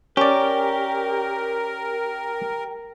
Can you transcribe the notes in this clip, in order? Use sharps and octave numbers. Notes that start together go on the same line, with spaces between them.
C#4 G4 A#4 D5